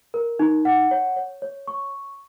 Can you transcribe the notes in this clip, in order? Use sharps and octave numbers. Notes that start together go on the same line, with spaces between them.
A#4
D#4
F#5
C#5
C#5
C#5
C#6